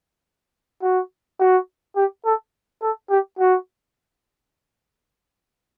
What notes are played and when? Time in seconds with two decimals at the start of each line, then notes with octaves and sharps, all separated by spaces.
0.83 F#4
1.40 F#4
1.96 G4
2.25 A4
2.82 A4
3.10 G4
3.39 F#4